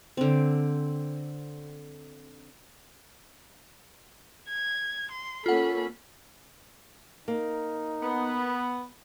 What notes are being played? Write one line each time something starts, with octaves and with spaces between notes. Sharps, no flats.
D3 C4
G#6
C6
A#3 C#4 F4 A4 F#5 B5
A#3 D#4
B3